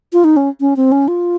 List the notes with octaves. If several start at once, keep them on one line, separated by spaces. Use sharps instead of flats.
F4
D#4
C#4
C#4
C4
C#4
F4